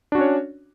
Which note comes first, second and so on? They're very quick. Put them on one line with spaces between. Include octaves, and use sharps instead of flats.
D4 F#4 C#4 C#5